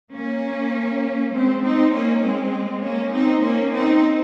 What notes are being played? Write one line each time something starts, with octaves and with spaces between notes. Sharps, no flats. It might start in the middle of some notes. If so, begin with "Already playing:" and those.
A#3 C#4
G#3 C4
C4 D#4
A#3 C#4
G#3 C4
A#3 C#4
C4 D#4
A#3 C#4
C4 D#4